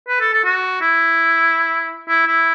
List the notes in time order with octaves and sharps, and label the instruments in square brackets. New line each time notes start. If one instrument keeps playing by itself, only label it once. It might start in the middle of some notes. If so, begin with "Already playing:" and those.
[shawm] B4
A4
A4
F#4
E4
E4
E4